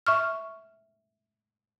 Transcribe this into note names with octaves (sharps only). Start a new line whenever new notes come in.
E5 C#6 F6